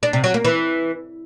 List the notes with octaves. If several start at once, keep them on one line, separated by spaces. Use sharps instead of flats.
D4
C3
F#3
A#3
E3